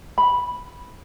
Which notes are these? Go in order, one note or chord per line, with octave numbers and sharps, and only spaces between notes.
B5